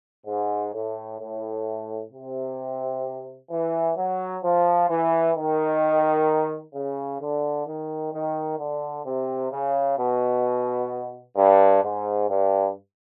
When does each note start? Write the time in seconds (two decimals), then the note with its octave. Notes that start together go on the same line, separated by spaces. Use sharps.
0.26 G#2
0.73 A2
1.19 A2
2.12 C3
3.50 E3
3.96 F#3
4.43 F3
4.89 E3
5.35 D#3
6.74 C#3
7.21 D3
7.66 D#3
8.13 D#3
8.58 D3
9.05 C3
9.51 C#3
9.98 B2
11.36 G2
11.82 G#2
12.29 G2